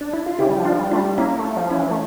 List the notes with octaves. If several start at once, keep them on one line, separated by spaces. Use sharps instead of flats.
D4
E4
F4
C#3 E4 G4
G3
F3
D4 F4
G3
A3 D4 F4
G3
A#3 C#4 E4
A3
F3
C#4 E4
E3
A3